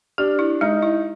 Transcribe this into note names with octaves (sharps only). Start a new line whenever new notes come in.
D4 G4
E4
G#3 D#4
E4